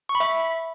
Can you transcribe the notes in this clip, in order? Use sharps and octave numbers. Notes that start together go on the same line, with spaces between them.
C#6
B5
E5